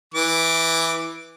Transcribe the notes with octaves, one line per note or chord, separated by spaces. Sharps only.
E3 D6